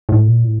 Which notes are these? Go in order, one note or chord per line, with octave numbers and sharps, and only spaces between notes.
A2
A#2
A2